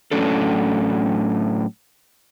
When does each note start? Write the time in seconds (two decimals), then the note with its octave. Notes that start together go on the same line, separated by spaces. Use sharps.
0.11 A2 F#3 C#4 D4 A4